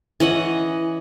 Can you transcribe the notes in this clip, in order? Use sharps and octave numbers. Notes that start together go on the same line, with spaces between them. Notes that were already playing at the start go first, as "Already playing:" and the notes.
E3 C#4 D#5 F#5